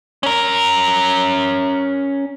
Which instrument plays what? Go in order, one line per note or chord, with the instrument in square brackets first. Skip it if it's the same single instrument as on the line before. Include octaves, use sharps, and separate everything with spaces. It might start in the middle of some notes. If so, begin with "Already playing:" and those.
[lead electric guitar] C#4 A#4